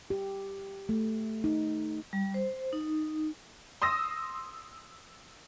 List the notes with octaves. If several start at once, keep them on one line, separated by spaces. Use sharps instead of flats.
G4
A3
D#4
G3
C5
D#4
C6 D#6 E6 A#6